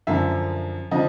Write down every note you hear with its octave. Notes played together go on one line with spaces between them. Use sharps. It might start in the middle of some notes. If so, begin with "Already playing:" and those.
F#2 D3 F3 E5
D3 F3 D#5